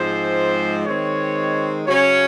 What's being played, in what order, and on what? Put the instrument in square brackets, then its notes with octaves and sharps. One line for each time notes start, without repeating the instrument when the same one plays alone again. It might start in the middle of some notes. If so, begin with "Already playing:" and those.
Already playing: [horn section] G#2 F3 G#3 C4 C5
D#3 G#3 C4 C#5
C#3 F#3 C#4 C#5